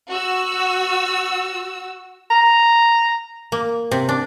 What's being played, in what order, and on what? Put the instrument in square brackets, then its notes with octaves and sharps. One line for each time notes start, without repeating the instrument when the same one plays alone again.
[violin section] F#4 E6
[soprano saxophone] A#5
[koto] A#3
C3
D4